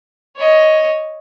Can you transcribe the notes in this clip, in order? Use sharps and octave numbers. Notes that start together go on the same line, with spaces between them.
C#5 D#5